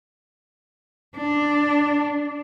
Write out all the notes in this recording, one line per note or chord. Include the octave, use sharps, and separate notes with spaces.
D4